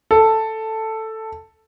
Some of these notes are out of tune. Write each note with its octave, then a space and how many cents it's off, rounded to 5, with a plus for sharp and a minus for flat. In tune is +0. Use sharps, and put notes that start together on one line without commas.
A4 +5